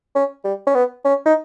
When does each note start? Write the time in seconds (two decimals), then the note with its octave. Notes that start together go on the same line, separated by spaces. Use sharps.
0.15 C#4
0.45 G3
0.67 C#4
0.75 B3
1.05 C#4
1.26 D#4